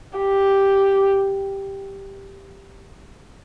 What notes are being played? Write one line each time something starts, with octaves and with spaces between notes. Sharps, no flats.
G4